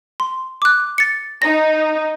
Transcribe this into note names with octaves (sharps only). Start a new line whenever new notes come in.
C6
D6 F#6
A6 C#7
D#4 A#6